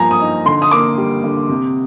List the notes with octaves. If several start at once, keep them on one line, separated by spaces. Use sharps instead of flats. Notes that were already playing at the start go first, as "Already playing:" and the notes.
Already playing: G2 F3 A#3 G#5 A#5
D#6
D#4
D3 C6
D#6
A#3 D6
G3
D3
C3